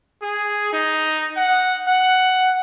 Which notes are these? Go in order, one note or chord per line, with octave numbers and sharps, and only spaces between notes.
G#4
D#4
F#5
F#5